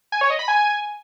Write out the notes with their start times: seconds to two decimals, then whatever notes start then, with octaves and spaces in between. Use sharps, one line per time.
0.12 G#5
0.21 C#5
0.30 D#5
0.39 B5
0.48 G#5